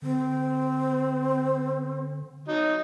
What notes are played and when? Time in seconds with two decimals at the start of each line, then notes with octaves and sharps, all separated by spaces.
0.02 D3 C4
2.48 F#3 D#4